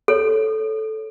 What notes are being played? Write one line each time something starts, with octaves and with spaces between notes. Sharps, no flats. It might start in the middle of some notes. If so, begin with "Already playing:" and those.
A4 C#5